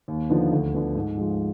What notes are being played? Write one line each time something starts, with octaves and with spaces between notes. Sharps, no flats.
D#2
D3 F3 B3 D#4
D2
D3 F3 B3
G#2
F3 G#3